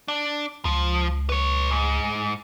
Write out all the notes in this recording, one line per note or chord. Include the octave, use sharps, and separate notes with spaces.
D4
C#2 F3
B4 C#5
G#2